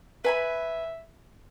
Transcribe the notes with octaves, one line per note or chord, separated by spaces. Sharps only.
B4 E5 G#5 B5